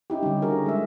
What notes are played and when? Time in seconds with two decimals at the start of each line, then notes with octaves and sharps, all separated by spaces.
0.10 C#4 D#4 E4 G4
0.23 D3 G3
0.42 F#4 G#4 A#4
0.66 G#3 E5